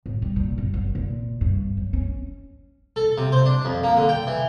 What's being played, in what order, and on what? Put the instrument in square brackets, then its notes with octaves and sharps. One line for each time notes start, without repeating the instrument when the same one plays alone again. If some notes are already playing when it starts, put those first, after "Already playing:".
[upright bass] A1
G3
A#2
G1
F#2
A#2
G2
F#3
C#4
[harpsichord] A4
C3
C5
D4
F2
A#3
D3
G5
E3